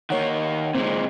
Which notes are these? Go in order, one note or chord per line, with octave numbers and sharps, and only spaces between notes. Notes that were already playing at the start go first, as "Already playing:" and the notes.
D#3 A#3 C#5 F#5
A#2 G#3 C4